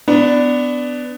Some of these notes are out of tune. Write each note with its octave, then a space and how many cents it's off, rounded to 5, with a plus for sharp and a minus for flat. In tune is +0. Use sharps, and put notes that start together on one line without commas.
B3 +20 D4 +0